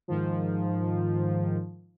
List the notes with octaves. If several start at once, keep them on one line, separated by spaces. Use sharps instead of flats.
G#2 D#3 F3